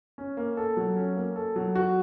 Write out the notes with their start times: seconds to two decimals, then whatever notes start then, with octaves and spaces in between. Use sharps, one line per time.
0.18 C#4
0.37 A#3
0.57 A4
0.77 F#3
0.96 C#4
1.17 A#3
1.36 A4
1.56 F#3
1.75 F#4